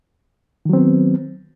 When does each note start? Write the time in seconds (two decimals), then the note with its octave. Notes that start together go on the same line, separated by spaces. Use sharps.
0.65 D#3
0.69 F#3
0.73 C4
0.77 B3